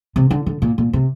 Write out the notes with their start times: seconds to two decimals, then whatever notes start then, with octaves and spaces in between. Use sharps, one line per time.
0.16 C3
0.31 D3
0.46 D3
0.62 A#2
0.78 A#2
0.93 C3